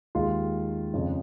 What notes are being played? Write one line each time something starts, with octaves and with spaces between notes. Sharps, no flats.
D#2 D#3 G#3 F4
F2 C#3 F3